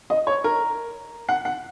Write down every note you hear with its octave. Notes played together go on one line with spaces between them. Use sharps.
D#5
C#5
A#4
F#5
F#5